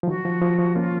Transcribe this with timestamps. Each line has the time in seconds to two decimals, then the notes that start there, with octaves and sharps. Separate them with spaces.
0.03 F3
0.07 D#3 F#3 F#4
0.25 F3
0.42 F3
0.58 F3
0.75 A#3 C#4 F4